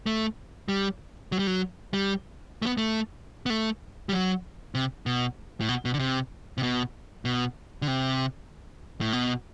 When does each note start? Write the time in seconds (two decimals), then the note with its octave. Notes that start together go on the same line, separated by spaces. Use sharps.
0.06 A3
0.68 G3
1.32 F#3
1.39 G3
1.47 F#3
1.94 G3
2.62 A3
2.66 B3
2.78 A3
3.46 B3
3.50 A3
4.09 G3
4.13 F#3
4.75 C3
5.06 B2
5.61 A2
5.68 B2
5.85 B2
5.94 D3
5.99 C3
6.58 C3
6.63 B2
7.25 B2
7.82 D3
7.88 C3
9.01 A2
9.13 B2